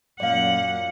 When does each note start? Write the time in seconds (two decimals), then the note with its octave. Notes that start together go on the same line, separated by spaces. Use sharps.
0.20 F#2 A#2 F#3 D5 F5 F#5